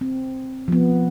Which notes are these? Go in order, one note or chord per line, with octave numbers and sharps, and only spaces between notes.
C4
F3 B3